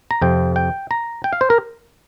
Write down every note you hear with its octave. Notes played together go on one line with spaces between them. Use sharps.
A#5
F2 C3 F3 G5
G5
A#5
G5
F5
C5
A#4